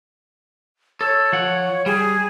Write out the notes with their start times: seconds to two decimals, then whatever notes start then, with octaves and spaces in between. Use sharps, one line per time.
1.01 A4 C#5
1.33 F3 F#5
1.86 G3 G#4